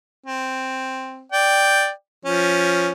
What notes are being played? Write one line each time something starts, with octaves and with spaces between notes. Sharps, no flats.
C4
D5 G5
F3 C#4